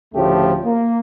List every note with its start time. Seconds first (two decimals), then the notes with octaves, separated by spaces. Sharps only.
0.14 D2 A2 C#3 F3 A3 G4
0.64 A#3